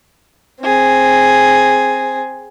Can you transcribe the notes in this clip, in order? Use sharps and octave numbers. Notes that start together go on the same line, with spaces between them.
C4 G#4